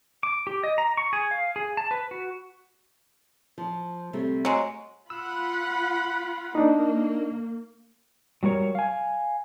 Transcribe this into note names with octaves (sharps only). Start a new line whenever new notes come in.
D6
G4
D#5
A#5
C#6
G#4
F5
G#4
A5
B4
F#4
F3
C3 G3 A3
F#3 G#3
F4 F#5 B5 E6
A#3 D4 D#4
F#3 G3 A#4 C#5
F5 G#5